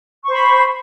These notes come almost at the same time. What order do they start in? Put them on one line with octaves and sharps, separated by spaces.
C#6 C5 B5